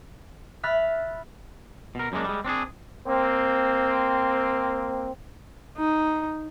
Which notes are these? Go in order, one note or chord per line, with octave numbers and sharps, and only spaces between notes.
E5 B5 F6 F#6 A6
B2 A#4
F#2 G3 G#3 A#3 D4
G3 G#3
C4 D4 F#4 G#4
A#3 C4
D#4